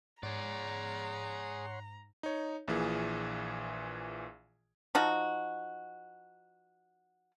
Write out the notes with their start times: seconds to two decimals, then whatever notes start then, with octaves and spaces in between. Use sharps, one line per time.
0.23 G#2 G#4 C#5 D5 F#5 A#5 C6
2.23 D#4 C#5
2.68 A#1 A#2 E3 G#4
4.95 F3 D#4 F#4